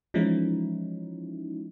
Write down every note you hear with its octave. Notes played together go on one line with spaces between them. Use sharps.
E3 F3 G#3 C#4 D#4 E4